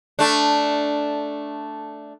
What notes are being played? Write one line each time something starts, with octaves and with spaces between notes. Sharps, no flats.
A3 D4